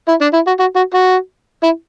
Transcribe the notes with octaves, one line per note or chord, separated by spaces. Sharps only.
E4
D4
E4
F#4
F#4
F#4
F#4
E4